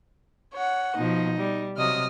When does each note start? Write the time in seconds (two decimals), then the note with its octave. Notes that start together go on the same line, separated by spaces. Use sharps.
0.54 C#5 F#5
0.96 B2 F3 D#4
1.39 G3
1.78 C3 F#3 D#5 D#6 F6